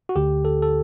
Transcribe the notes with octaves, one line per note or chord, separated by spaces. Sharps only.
F#4
D2 D3 G4
A4
A4